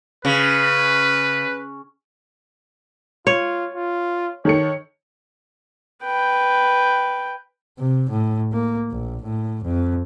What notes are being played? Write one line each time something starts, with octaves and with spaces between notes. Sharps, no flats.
C#3 B4
F4 C#5
F4
D#3 A4 C#5 C#7
B4 G5
C3
A2
A#3
A#1
A2
F2